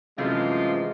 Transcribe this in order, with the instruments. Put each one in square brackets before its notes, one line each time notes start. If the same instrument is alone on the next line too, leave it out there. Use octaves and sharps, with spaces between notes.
[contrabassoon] F#2 [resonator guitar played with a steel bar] C3 E3 A3 [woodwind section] F3 F4 [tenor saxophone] G#3